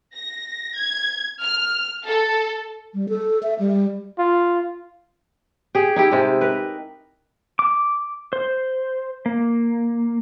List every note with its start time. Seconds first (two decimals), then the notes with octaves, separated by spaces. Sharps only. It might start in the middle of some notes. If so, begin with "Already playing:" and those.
0.15 A#6
0.77 G#6
1.43 F6
2.06 A4
2.94 G3
3.09 A4
3.43 E5
3.59 G3
4.19 F4
5.75 G4 G#4
5.96 D#4 E4 G4
6.11 C3 G#3 G4
6.41 A#4 B4
7.59 D6
8.33 C5
9.26 A#3